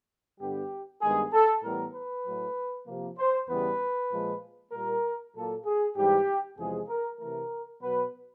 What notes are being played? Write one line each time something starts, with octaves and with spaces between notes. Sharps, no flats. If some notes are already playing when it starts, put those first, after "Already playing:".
G2 D3 G3 B3 G4
G2 D#3 G#3 B3 G#4
A4
A2 E3 G3 B3 A#4
B4
A2 F#3 A3
C3 F3 A#3
C5
E2 C#3 E3 G3 B3 B4
A#2 F3 G#3
A#2 G3 A#3 A#4
A#2 F#3 A#3 A4
G#4
G#2 E3 G3 G4
E2 C3 F3 G#3 G#4
A#4
C3 E3 A3 A#4
B2 F#3 B3 B4